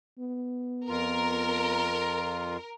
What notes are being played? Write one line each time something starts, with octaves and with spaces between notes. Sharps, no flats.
B3
F2 F4 A#4